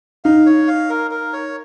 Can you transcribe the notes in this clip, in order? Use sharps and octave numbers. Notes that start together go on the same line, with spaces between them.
D#4 F5
C#5
F5
A#4
A#4
C#5